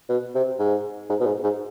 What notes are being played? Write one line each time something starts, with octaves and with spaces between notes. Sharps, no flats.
B2
C3
G#2
G#2
B2
G#2
G#2